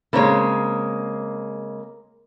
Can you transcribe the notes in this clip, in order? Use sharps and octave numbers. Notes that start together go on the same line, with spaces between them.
C#3 G#3 A#3 C4 C#5